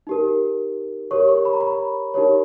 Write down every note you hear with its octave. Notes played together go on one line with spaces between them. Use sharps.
D#4 G4 A#4
G4 A#4 C#5 C#6
C#6
B5
A#5
B5
D#4 G4 A#4 C#5